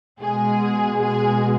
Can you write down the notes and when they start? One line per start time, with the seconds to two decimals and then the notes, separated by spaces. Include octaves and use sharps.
0.21 B2 G#3 G#4
1.01 G#4